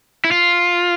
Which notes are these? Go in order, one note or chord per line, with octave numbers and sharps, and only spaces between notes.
E4
F4